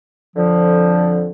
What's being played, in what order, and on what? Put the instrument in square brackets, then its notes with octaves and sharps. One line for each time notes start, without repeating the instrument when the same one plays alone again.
[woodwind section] F2 D3 F3